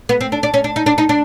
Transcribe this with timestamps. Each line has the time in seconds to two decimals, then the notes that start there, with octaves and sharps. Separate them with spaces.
0.09 B3
0.21 C4
0.32 D4
0.43 D4
0.54 C#4
0.64 D4
0.76 D#4
0.86 D4
0.98 D#4
1.09 D4